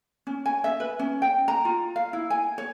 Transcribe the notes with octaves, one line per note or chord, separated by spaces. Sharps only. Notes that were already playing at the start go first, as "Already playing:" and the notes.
C#4
G#5
E5
B4
C#4
G5
A#5
F4
F5
E4
G#5
C#5